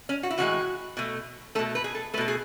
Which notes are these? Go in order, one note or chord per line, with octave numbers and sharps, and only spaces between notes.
C#4
F#4
E4
A2 E3 G#3 F#4
B2 A3
B2 A3 A4
B4
G#4
A4
B2 A3 A4 B4
G#4